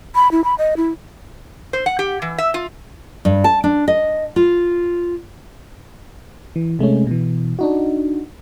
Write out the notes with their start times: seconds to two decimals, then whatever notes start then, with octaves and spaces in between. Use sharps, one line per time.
0.15 B5
0.32 E4
0.44 B5
0.58 D#5
0.77 E4
1.73 C5
1.86 F#5
1.99 G4
2.22 E3
2.38 E5
2.54 F4
3.25 G2
3.44 A5
3.64 D4
3.88 D#5
4.36 F4
6.56 E3
6.79 C3 G#3 A3 C#4
7.07 B2 E3
7.59 D4 D#4 F#4